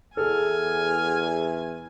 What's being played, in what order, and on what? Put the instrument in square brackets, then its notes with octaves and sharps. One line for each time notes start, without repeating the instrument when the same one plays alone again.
[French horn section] E2 [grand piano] G#4 A4 [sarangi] G#5 [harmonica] F6